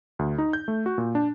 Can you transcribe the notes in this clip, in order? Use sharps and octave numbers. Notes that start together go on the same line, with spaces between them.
D2
D#4
G6
A3
F#4
A#2
D4